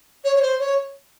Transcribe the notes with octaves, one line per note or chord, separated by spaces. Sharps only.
C#5
C#5
C5
C#5